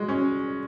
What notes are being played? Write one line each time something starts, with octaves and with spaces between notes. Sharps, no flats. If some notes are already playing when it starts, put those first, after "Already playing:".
Already playing: G#3 F#4
C#4